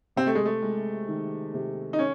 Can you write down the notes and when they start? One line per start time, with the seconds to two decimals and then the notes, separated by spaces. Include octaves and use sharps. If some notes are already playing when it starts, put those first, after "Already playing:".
0.16 C3 C4
0.26 A3
0.35 G#3
0.46 A3
0.62 G#3
1.08 D#3
1.54 C3
1.93 D#4
1.99 C#4